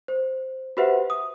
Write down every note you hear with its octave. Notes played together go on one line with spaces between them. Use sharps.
C5
F#4 G4 B4 C5 E5 F#5
D#6